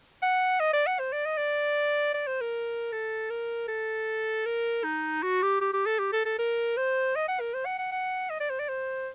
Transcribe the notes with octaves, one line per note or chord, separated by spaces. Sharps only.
F#5
D#5
D5
F#5
C5
D5
D#5
D5
D5
C5
A#4
A4
A#4
A4
A#4
D#4
F#4
G4
G4
G4
A4
G4
A4
A4
A#4
C5
D#5
F#5
A#4
C5
F#5
F#5
F#5
D#5
D5
C5
D5
C5